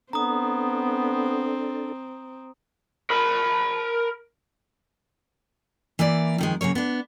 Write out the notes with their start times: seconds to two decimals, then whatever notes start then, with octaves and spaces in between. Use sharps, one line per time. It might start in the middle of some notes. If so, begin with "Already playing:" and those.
0.13 B3 C4 D4 A4 A#5 D#6
3.10 A#4 B5
5.99 E3 A#3 E4 D5
6.38 F2 D#3 G#3
6.61 C#3 F#3 A#3 C#5
6.75 B3 D4